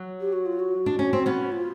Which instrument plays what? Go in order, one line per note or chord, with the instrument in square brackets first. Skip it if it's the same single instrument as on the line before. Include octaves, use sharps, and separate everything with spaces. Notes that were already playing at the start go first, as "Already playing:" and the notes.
Already playing: [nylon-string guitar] F#3
[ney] G4
F#4
F4
F#4
[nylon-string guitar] D4
C#4
C4
B3 C#4
[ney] F4